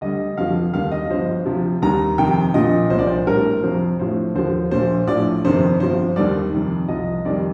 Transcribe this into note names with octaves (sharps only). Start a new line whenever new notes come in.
D2 D3 G3 D#5
F1 F2 D3 F3 F5
D#2 D#3 G3 F5
D#5
G1 G2 F3 C5
D2 C3 F3
D#2 D#3 G3 A#5
F2 C3 D#3 G5
A#1 A#2 F3 D#5
C2 A#2 F3 C5
D5
C5
A#1 A2 G3 A#4
F2 C3 F3 C5
A#1 A2 F3 C5
D#2 D3 F3 C5
A#1 A#2 F3 C5
A#1 A2 F3 D5
G1 F2 C3 D#3 C5
G1 G2 F3 C5
D#2 D#3 G3 D5
F2 C3 D#3 G3
C2 C3 F3 D#5
F2 D#3 G3 D5